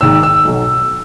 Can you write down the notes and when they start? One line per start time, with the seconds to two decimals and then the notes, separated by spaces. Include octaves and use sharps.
0.01 G#1 G#2 D#3 E6
0.23 E6
0.45 B1 B2 F#3